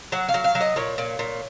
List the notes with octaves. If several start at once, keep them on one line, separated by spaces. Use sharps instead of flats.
F#3 F#5
F5
F#3
F5
F#3
D#5
A#2 C#5
A#2
A#2